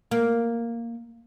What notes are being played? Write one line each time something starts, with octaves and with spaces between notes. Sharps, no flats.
A#3